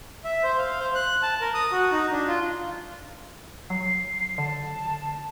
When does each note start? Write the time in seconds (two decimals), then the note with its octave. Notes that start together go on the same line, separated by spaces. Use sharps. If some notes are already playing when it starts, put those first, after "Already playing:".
0.24 E5
0.43 C5
0.58 F5
0.80 C5
0.95 F#6
1.22 A5
1.41 A#4
1.54 D#6
1.72 F#4
1.92 D#4
2.11 D4
2.27 F4
3.70 F#3 C7
4.38 D3 A5